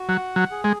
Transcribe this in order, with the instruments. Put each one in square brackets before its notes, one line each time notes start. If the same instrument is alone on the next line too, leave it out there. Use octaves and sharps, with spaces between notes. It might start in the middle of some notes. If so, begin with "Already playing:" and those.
Already playing: [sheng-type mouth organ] F#4
[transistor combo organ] F#3 [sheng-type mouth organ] F#5
[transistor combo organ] F#3
[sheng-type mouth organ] G#4
[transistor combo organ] G#3